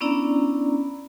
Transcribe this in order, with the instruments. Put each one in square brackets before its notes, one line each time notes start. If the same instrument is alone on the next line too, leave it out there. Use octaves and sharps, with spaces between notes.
[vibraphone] B3 C#4 D4 E4 D5 A#5